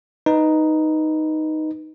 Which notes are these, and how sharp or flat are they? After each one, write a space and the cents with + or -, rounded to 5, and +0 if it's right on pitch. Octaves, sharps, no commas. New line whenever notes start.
D#4 +0 B4 +0